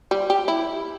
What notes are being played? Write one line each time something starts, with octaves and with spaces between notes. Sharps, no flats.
G3
G4
E4